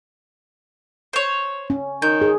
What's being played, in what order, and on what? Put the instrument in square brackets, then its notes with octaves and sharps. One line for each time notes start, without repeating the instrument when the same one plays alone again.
[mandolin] C5 C#5
[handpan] C#4
[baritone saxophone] D#3 [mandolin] G6
[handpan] G#4